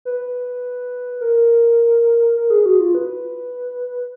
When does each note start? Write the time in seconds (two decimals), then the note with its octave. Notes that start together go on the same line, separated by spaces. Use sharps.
0.05 B4
1.21 A#4
2.36 A#4
2.50 G#4
2.66 F#4
2.80 F4
2.95 B4